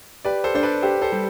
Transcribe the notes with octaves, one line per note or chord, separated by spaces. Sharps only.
G4 B4 D5
A4 C5
D4 C5
B4 D5
G4 A4 C5
A4 C5
G3